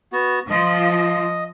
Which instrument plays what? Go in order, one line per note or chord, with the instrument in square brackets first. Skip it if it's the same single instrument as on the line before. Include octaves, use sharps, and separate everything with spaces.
[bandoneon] B3 F#4
[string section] F3 [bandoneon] D#5